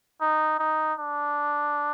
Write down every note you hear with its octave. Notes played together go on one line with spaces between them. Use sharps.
D#4
D#4
D4